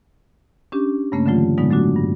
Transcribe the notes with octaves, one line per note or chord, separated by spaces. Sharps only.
C#4 D4 G4
G2 C#3 A3 A#3 C#4
D3 E3 F#3 A3 F4
A2 D3 F#3 G#3 B3 D#4
F#3 A3 D4 F#4
G2